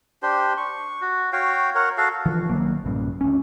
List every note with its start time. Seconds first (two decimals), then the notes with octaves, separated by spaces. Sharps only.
0.22 D4 G4 C5
0.57 C#6
1.02 F#4
1.33 F#4 C#5 F5 G5
1.75 A#4 C#5 F#5
1.97 F#4 A4 F5
2.26 D3 E3 F3
2.50 B1 D#3 F#3 A#3
2.85 B1 G2 A#2 C#3
3.21 D2 C#4